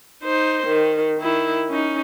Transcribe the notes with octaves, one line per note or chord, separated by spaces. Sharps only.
D#4 C5
D#3
D#3 E4
C#4 D#4